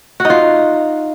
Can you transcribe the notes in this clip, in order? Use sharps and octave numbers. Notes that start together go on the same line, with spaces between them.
F#4
D#4
F4